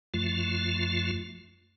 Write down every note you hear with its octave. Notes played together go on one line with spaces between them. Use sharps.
F#2 F3 A3 F4